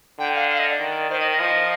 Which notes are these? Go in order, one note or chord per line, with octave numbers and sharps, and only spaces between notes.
D3 G5
F5
F5
D#5
D5
D#3
D#3 C5
D#5
D#5
F3